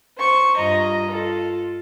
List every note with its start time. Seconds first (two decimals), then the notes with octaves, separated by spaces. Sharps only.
0.17 C5 C#6
0.57 G2 F4 D#5 A#5
1.09 F4 A4